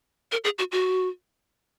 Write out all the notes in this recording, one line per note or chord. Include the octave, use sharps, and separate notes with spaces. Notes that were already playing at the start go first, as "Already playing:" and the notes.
A#4
G#4
F#4
F#4